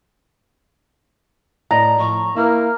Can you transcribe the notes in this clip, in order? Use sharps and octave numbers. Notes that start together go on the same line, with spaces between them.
A2 D5 D#5 A#5
A2 F3 C#6
A#3 E4 B4 F6